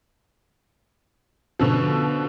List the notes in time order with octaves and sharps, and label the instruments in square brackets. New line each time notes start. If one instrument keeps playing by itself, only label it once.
[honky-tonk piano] B2 D3 F3